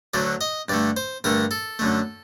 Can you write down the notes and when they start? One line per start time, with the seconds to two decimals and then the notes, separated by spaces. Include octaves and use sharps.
0.14 D2 D3 F#3 A3 D5
0.41 D#5
0.69 G2 D3 A3 D5
0.97 C5
1.24 G2 D3 A3 A#4
1.51 A4
1.79 F#2 D3 A3